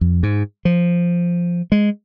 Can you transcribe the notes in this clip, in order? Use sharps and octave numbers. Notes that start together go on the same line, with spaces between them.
F2
G#2
F3
G#3